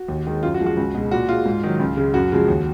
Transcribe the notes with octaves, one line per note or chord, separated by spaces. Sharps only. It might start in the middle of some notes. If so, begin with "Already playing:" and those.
Already playing: F#4
D#2
D#3 G#3
F#2 F4
F#4
F3 G#3
F#4
C#2
B2 G#3
A#2 F#4
G#3 F4
G#2
D#3 F#3
C#2
C#3 G#3
F#2 F#4
C#3 F3 G#3
D#2